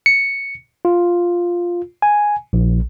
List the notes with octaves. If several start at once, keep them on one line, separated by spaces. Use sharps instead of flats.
C#7
F4
G#5
A#1